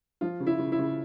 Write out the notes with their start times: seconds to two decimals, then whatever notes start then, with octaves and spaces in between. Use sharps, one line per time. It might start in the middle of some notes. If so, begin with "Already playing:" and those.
0.21 F3 F4
0.40 C#3
0.47 E4
0.59 C#3
0.72 E4
0.79 C#3